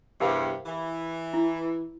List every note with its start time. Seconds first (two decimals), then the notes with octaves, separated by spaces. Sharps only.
0.20 E2 G2 C3 G4 A#4 F5
0.66 E3
1.34 E4